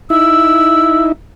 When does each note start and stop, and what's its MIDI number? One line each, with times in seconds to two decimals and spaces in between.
0.10 1.12 63
0.10 1.12 64
0.10 1.05 88